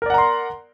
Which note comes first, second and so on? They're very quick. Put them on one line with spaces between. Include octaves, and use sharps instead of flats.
A#4 D5 F#5 A#5 C6